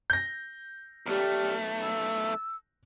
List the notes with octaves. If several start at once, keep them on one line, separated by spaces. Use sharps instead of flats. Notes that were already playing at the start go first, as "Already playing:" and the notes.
G6 A#6
B1 A3 G4 D5 F6
E6